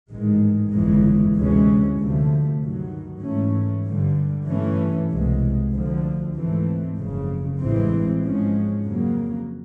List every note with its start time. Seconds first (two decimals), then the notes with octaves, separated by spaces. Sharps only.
0.11 A1 G#2 D#3 G#3
0.72 G1 F2 C#3 E3 G#3
1.35 D2 C3 E3 G#3 C#4
1.98 D2 C3 F3 A3
2.61 G2 D#3 F#3
3.22 G#2 E3 A3 C#4
3.85 G2 D3 G3
4.48 G2 E3 A3 C#4
5.10 C2 B2 G#3
5.73 D2 D3 F3
6.35 G#2 E3 A3 C4
6.97 F#1 F2 C#3
7.60 A1 G2 E3 G#3 C4
8.22 G#2 F3 G#3 C#4
8.85 F2 C#3 F#3 A#3